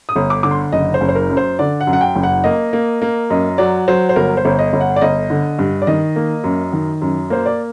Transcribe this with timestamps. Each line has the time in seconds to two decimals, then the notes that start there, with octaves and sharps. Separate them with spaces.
0.09 D#6
0.16 G1
0.30 D6
0.43 D3 D6
0.51 C6
0.72 F#1 D#5
0.94 C5
1.01 F#1
1.09 C5
1.15 A#4
1.30 F#2
1.37 C5
1.59 D3 D5
1.81 F#5
1.87 F#2
1.93 F#5
2.01 G5
2.15 F#1
2.23 F#5
2.44 A#3 D#5
2.73 A#3
3.02 A#3
3.30 F#2 D#5
3.58 F#3 D5
3.88 F#3 C5
4.09 C5
4.16 G1 A#4
4.37 C5
4.45 G1
4.59 D#5
4.73 G1
4.81 F#5
4.96 D5
5.02 G1 D#5
5.30 D3
5.59 G2
5.82 D5
5.87 D#3 D#5
6.16 A#3
6.44 F#2
6.73 D#3
7.02 F#2
7.30 A#3 C5
7.46 D5